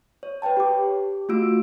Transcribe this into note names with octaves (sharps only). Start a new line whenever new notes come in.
C#5
B4 C#5 G5 A5
G4 D6
A3 F4 F#4 E6 D7